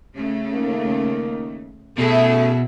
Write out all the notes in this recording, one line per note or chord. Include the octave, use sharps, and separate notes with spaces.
C#3 A3
D#3 A#3
F#2 B2 A3 E4 G#4 E5